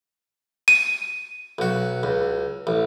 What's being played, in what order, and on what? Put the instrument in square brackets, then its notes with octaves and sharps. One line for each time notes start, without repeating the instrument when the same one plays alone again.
[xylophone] D#7
[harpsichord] B1 F#4
C#2
A1